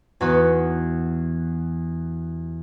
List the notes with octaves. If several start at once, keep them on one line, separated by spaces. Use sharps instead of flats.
E2 B3 F#4 B4